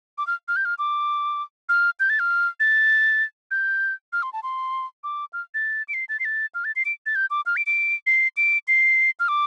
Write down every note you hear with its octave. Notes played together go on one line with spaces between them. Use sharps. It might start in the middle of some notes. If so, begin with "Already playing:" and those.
D6
F6
F6
G6
F6
D6
F6
G6
A6
F6
A6
G6
F6
C6
A5
C6
D6
F6
A6
D7
C7
A6
C7
A6
F6
A6
C7
D7
A6
G6
D6
F6
D7
D7
C7
D7
C7
F6
D6